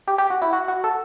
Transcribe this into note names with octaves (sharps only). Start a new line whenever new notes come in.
G4
G4
F#4
E4
F#4
F#4
A4